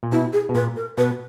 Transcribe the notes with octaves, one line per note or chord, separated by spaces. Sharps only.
A#2
B2 E4
G#4
B2
A#2 B4
A#4
B2 B4